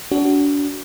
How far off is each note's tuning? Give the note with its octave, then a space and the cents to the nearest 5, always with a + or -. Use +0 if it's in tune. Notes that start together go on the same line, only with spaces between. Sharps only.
D4 -35 F#4 +20